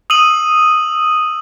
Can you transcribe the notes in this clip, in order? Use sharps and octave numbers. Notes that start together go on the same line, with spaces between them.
D#6 E6 D#7 F#7